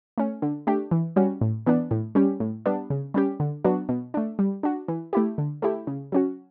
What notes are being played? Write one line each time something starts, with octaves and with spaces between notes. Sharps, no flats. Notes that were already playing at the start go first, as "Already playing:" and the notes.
A3 C#4
D3
A3 D4 G4
E3
G3 C#4 F#4
A2
E3 B3 D4
A2
G3 C#4 G4
A2
G3 B3 D4
C#3
G3 C#4 G4
D3
F#3 B3 D4 F#4
B2
A3 D4
G3
D4 F#4
E3
A3 E4 G4
D3
A3 E4 G4
C#3
F#3 C#4 F#4